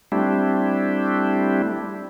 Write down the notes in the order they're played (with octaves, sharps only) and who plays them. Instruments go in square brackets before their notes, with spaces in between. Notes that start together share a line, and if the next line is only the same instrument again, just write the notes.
[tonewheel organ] G3 A3 C4 D4 E4 G4